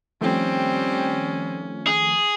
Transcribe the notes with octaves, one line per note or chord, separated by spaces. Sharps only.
D#3 F3 G3 A3 C4 C#4
G#4